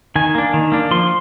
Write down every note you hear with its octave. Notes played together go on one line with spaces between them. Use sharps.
D#3 G#5
A#3 D4
D#3
A#3 D4
F3 C6